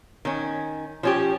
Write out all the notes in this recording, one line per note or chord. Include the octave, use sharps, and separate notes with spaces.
D#3 C#4
F3 C#4 G4